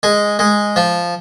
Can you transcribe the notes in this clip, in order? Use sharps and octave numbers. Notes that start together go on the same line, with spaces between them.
G#3
G#3
F3